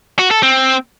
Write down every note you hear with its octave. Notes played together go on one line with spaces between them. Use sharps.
F#4
A4
C4